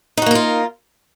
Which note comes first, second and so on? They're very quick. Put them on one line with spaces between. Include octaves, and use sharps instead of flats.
D#4 F#4 A#3 A#4 F4